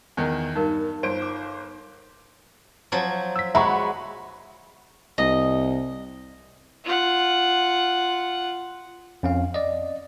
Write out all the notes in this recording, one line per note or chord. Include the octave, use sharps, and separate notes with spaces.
E2 D#3
G2 D#4 A#4
G1 C5 D7
D6
F3 F#3
E6 B6
G#3 E5 F#5 A#5 B5 C#6
C2 D#5
F4 F#5
F2 C#4 F5
D5 D#5